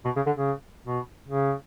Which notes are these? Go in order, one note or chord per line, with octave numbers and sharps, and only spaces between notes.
B2
C#3
D3
C#3
B2
C#3